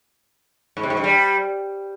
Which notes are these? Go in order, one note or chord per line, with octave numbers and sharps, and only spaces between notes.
G#2
C3
G#2
G2
G3